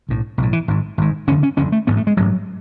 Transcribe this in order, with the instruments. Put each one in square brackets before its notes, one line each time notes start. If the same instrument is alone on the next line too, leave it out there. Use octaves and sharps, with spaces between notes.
[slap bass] B1 A2
B1 A2
E3
G#1 G#2
G#1 G#2
F#1 E2 D3 C#4
C#4
F#1 E2 D3 C#4
A3
A1 G#2 B3
A3
G#3
A1 G#2 F#3